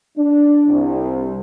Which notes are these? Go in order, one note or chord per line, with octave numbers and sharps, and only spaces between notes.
D4
C2